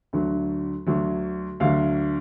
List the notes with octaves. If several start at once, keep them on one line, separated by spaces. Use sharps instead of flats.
D2 D3 F#3
D2 D3 F#3
D2 D3 F#3 F5